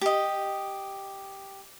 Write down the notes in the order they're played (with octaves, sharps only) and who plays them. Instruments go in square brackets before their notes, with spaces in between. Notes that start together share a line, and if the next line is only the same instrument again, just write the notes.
[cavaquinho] G4 D#5